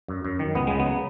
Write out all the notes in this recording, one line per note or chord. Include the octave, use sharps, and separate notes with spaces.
F#2
F#2
D#3
C#2 B3
C#3 G#3
B3
F#3